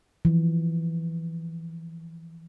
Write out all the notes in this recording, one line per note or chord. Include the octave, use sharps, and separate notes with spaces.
E3 F3